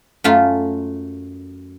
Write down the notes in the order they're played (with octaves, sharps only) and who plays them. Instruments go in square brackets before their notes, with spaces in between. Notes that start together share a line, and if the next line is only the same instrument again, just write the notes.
[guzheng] F#2 A3 F4